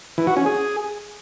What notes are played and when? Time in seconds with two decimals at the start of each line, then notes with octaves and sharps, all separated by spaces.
0.18 E3
0.27 F#4
0.37 C#4
0.46 G#4